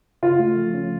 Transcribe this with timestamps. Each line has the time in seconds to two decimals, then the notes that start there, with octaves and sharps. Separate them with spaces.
0.23 C#3 F4
0.39 A3
0.57 F3
0.74 C#4